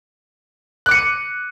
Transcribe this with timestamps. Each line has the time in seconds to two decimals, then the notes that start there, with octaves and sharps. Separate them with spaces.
0.86 F#6
0.89 D6
0.91 C#7
0.94 D#7